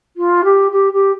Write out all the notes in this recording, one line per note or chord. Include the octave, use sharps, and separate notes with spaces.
F4
G4
G4
G4